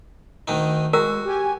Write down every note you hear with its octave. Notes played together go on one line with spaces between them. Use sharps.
D2 D#3 D#4
G#3 F#4 A#4
G4 G#5